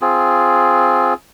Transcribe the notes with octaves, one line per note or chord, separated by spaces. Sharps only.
C4 F4 G#4